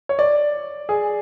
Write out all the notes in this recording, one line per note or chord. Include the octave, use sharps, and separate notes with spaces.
C#5
D5
G#4